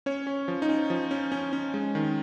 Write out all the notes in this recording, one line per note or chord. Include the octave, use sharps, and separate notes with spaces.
C#4 C#5
C#4
F3
D#4
C#4
F3
C#4
C#4
C#4
G#3
D#3